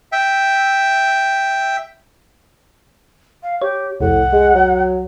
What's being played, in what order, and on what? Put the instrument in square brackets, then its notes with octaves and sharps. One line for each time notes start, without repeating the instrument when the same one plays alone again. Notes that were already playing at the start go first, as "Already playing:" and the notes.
[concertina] E5 G5
[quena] F5
[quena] G4 [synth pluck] C#5
[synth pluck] C2 F2 [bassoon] A2 [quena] F#5
[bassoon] G#3
F#3